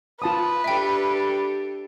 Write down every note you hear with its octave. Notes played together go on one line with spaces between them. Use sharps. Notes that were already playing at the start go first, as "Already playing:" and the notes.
F4 B4 A5 D#6
D4 G4 A4 E5 G5